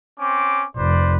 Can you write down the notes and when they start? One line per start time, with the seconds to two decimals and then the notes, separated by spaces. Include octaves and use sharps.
0.19 C4 C#4 D6
0.77 F1 B4 C5 D5